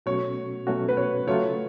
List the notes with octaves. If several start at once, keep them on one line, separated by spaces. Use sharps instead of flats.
B2 F#3 A3 C#4 F#4 C#5
B2 F#3 A3 C#4 F#4
B4
C#5
C#3 F#3 A3 F4 C#5